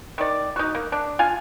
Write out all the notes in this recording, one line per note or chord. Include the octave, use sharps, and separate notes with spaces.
D#3 D5
D#4 F#4
A#3
D4
F4 F5 G#5